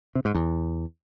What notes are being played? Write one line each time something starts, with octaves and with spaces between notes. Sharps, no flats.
C3
G#2
E2